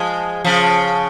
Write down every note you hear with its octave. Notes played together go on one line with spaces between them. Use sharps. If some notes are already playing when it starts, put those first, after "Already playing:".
Already playing: F3 G#3
C#3 F3